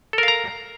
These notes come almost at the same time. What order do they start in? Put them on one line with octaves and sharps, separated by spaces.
A4 A#4 F5 A#5